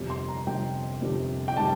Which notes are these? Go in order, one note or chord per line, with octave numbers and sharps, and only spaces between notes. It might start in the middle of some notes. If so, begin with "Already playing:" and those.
Already playing: G1 F2 C3 G3
C6
A#5
G1 F2 C3 G3 G5
G1 F2 C3 G3
G5
C3 G3 A5